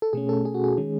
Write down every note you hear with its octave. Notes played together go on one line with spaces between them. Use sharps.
A4
B2 A3 C#4 G#4
A4
G#4
F#4
G#4
D#3 G#3 C#4